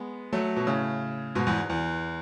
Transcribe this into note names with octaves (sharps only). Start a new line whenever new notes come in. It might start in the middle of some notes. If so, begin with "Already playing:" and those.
Already playing: G#3 B3
F#3 A3
B2
A2 C#3
G#2 B2
E2 G#2
E2